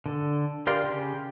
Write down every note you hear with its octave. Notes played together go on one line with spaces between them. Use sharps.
D3 A4
G4 A#4 D5 F5 C6
C#3 G4